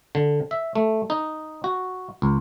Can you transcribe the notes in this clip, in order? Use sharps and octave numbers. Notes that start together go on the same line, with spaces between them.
D3
E5
A3
D#4
F#4
C#2